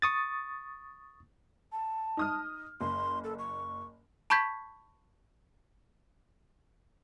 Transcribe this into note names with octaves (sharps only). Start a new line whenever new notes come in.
C#6 D#6 A6
A5
D#4 D#6 F6
F#1 C6
A4
C#6
A5 B5 C#6 G6 G#6 B6